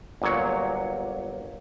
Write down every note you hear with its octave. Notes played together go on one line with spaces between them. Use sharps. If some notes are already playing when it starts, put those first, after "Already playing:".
G1 A#2 F#3 C#5